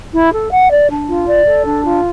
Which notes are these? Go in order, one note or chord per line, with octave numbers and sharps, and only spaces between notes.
E4
A4
F#5
D5
D4
F4
D5
A4
D4
F4